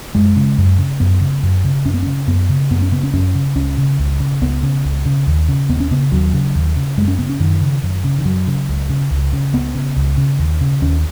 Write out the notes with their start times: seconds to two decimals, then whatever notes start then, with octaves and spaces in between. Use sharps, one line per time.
0.15 F#2 G#3
0.36 C#3
0.58 F#2
0.78 C#3
1.00 F#2 B3
1.21 C#3
1.43 F#2
1.64 C#3
1.85 F#2 C#4
1.94 B3
2.03 C#3 C#4
2.27 F#2 B3
2.49 C#3
2.71 F#2 B3
2.82 C#4
2.92 C#3 B3
3.03 C#4
3.13 F#2 C#4
3.35 C#3
3.55 C#2 C#4
3.78 C#3
3.99 C#2
4.20 C#3
4.41 C#2 B3
4.63 C#3
4.85 C#2
5.05 C#3
5.27 D#2
5.49 C#3
5.69 D#2 B3
5.80 C#4
5.91 C#3 B3
6.12 D#2 F#3
6.33 C#3
6.55 D#2
6.76 C#3
6.97 F#2 G#3
7.08 C#4
7.18 C#3 B3
7.29 C#4
7.40 F#2 D#3
7.62 C#3
7.83 F#2
8.04 C#3
8.19 D#3
8.25 F#2 F#3
8.47 C#3
8.69 C#2
8.89 C#3
9.11 C#2
9.33 C#3
9.53 C#2 B3
9.75 C#3
9.96 C#2
10.17 C#3
10.39 D#2
10.61 C#3
10.82 D#2 C#4